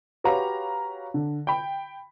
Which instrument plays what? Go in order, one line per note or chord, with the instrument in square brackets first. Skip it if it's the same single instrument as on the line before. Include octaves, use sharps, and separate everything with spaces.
[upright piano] F#4 G4 B4 C#5 F5 A#5
D3
G5 B5